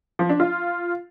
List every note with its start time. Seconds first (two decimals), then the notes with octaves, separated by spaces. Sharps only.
0.19 F3
0.29 D4
0.40 F4